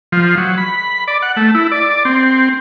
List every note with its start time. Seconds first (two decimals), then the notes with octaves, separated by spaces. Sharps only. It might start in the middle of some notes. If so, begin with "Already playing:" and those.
0.12 F3
0.37 F#3
0.58 B5
1.08 D5
1.22 F#5
1.37 A3
1.55 E4
1.72 D5
2.05 C4